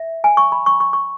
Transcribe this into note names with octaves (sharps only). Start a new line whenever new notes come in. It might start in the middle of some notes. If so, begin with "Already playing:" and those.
Already playing: E5
G#5
C#6
B5
C#6
C#6
C#6